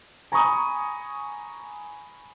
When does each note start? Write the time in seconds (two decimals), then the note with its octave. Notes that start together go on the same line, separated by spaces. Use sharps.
0.32 G#5 A#5 B5 C#6 D#6